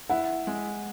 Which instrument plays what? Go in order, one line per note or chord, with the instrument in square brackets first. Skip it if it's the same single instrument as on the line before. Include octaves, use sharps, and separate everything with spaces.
[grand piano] E4 [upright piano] F#5
[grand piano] G#3